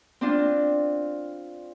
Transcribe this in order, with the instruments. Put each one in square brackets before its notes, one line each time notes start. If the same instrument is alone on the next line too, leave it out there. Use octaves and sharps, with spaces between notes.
[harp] C4 D4 F4